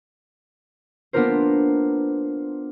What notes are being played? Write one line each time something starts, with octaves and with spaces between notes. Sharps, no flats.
A#3 B3 D4 F4 A#4 C5